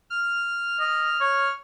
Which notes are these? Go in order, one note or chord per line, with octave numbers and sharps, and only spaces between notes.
F6
D#5
C#5